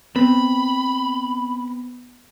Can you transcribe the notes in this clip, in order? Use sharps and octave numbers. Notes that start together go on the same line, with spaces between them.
B3 C4 B5